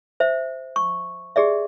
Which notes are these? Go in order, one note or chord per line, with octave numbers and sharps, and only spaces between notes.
C5 E5
C#6
G4 G#4 D5 E5